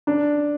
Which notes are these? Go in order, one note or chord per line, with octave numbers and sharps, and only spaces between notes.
D4